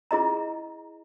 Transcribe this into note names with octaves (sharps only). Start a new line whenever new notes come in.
E4 G#4 D#5 A#5